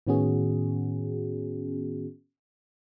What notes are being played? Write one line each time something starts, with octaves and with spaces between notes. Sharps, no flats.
A2 D#3 B3 C#4 F#4 G#4